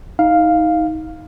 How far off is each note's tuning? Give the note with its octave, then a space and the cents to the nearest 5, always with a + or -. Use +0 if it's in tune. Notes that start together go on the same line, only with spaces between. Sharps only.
D#4 +25 F5 +0